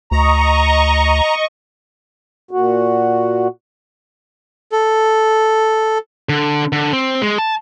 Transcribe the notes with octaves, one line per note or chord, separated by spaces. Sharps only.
D2 D#5 A#5 C#6
A#2 F#4
A4
D3
D3
C4
G#3
A5